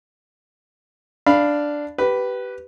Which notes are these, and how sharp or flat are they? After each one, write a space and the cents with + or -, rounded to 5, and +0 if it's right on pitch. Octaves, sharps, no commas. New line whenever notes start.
D4 +0 F5 -10 B5 +0
G4 -20 B4 +0